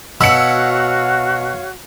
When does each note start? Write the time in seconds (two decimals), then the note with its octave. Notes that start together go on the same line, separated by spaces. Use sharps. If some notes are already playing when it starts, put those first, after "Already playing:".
0.21 B2 F#4 C#5 F5 F#5 B5 E6 C#7